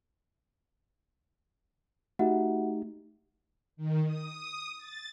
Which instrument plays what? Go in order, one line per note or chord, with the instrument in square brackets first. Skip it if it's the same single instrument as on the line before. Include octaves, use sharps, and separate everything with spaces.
[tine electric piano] A3 D#4 G4 [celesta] F#4 E5 F#5
[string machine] D#3
D#6
A6